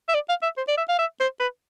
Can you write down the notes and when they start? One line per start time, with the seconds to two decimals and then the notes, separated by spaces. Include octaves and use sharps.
0.08 E5
0.14 D5
0.29 F5
0.43 E5
0.57 C5
0.68 D5
0.77 E5
0.89 F5
0.99 E5
1.20 C5
1.40 B4